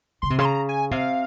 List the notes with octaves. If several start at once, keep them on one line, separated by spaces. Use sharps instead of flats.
C#3 C6
C3
C#3 C6
A#5
G#5
C3 F5